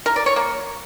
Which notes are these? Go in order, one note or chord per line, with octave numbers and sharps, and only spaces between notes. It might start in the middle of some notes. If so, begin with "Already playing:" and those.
A#4
D5
C#5
A#3